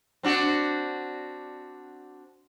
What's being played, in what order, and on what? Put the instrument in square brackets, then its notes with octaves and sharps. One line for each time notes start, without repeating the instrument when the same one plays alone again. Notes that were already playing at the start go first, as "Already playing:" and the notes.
[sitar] C4 D4 F#4